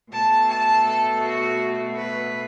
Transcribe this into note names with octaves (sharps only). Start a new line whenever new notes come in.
B2 A3 A5
A5
A4
F#4
B4